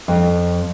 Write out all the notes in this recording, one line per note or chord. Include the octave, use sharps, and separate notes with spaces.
F2